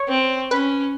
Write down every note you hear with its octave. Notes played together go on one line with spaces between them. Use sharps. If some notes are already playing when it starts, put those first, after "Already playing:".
Already playing: C#5
C4
C#4 B4